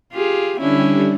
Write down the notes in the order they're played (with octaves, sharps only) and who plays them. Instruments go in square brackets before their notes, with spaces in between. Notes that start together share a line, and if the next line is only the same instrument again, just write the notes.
[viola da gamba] F4 G4 G#4
[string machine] D3 G3 [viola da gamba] C#4 D4 E4